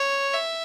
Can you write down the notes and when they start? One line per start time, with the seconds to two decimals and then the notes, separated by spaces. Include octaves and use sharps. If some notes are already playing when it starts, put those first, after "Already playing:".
Already playing: C#5
0.33 E5